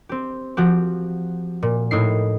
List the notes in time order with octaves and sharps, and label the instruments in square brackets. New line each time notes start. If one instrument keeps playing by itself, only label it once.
[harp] C4 G4
F3 F#4 G4
A#2
A2 D#4 E4 C7